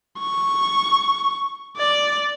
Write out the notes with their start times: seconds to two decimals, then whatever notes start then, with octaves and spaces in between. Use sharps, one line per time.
0.20 C#6
1.78 D5